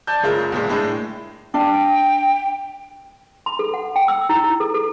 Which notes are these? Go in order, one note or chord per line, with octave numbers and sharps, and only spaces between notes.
D5 A5 G6
F#1 C#3 G#3 A3 F4 A#4
G1 A#2 G#3
A2 G#3 D4
D4 F5 G5
C6
A4
F#5
G5
E6
E4
E4
A4
A4